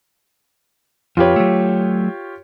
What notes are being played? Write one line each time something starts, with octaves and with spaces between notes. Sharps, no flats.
F2 F4 G4 B4 C#5
F#3 A3